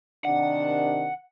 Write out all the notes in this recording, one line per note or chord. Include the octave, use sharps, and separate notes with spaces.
C3 D#3 D4 F#5